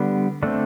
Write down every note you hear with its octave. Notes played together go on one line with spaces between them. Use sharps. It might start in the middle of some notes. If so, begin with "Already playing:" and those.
Already playing: D3 G3 B3
D3 A3 C4 D4